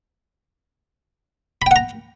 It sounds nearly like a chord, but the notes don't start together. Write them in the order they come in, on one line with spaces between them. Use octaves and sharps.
B5 G5 F#5 A#5